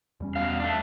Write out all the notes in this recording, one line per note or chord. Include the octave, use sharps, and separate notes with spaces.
E2 G3 C#4
B2 F5
A3 D4